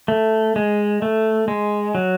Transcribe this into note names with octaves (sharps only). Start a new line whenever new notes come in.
A3
G#3
A3
G#3
F#3